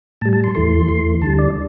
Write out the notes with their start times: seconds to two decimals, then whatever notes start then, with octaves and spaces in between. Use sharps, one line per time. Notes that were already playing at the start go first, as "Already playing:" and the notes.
0.21 A2 A5
0.26 G3
0.33 A5
0.44 C6
0.55 E2 E3 A3 C6
0.88 E2 E3 A3
1.21 D2 D3 G3 A5
1.39 D5